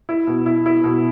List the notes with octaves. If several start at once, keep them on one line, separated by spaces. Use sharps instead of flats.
E4
B2
E4
E4
B2